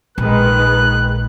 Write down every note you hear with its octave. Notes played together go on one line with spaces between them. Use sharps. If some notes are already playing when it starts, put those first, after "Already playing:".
A#1 D#3 G#3 B4 F#6